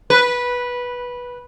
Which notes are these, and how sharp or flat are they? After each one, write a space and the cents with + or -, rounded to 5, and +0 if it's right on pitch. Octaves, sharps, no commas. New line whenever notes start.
B4 -10